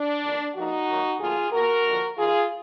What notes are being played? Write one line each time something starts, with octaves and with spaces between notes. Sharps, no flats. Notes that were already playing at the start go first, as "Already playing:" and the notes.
Already playing: D4
F2 D#3 A#3
F2 F3 A#3 D#4 F#4
F#2 D#3 F#3 A#3
D2 D3 F3 A#3 F4 G#4
B2 A#3 F#4 A#4
D#2 D3 F3
D#2 D#3 A#3 F4 G#4